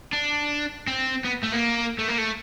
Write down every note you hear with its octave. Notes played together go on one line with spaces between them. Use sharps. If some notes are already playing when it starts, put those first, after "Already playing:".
D4
C4
B3
A3
A#3
A3
A#3
A3